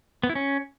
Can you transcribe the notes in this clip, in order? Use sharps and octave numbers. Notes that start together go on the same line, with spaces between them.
B3
E4
C#4